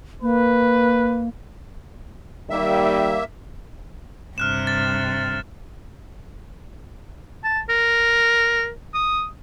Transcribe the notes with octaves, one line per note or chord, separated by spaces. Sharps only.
A#3 B4
D#3 G3 A#3 E5
G2 C3 F6 F#6 E7
A6
A5
A#4
D#6